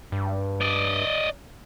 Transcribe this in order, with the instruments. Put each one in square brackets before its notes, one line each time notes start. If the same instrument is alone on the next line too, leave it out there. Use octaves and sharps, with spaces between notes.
[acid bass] G2
[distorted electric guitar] D5 D#5